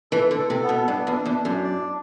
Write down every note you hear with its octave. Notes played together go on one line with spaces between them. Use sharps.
E3 A4
D3
A4
C3
B3
B2
G2 D4
E2
D4
E2
D4
F#2
D5